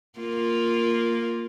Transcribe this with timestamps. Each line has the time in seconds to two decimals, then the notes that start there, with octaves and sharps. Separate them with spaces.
0.19 A#3 F4